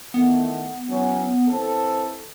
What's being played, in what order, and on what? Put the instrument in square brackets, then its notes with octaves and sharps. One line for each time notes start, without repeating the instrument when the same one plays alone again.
[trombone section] D#3 E3 A3 [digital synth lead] B3
[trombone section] E3 F#3 C#4
E3 C4 A4